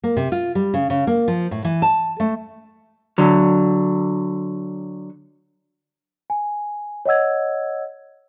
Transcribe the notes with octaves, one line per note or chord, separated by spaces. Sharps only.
A#3
C3
F4
G3
C#3
C#3
A#3
F3
A2
E3
A5
A3
D3 F#3
G#5
C#5 D#5 F#5 E6 G#6